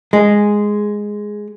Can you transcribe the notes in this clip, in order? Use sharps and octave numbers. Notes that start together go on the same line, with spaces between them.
G#3